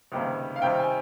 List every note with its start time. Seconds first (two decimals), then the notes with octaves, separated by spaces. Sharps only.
0.12 C#2 C3 D#3 G3 A#3
0.56 F5
0.62 C3 D#3 G3 C4 G5
0.79 G#5